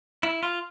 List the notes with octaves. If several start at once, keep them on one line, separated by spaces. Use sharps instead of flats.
E4
F4